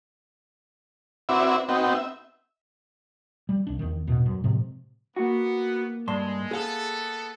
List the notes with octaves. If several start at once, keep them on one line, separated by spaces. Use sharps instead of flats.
C4 E4 F#4 B4 D5 E5
B3 C4 D#4 F#4 G5
E5
G3
C2 D4
E2 D#3
A1 E2 B2
F#2
A2 C3 F3 G#3
A#3 B3 E4 F#4
G2 G#3 E5 A5 C6
B3 G#4 A4 F5